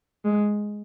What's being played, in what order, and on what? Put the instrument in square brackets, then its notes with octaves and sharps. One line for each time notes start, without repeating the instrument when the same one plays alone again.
[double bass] G#3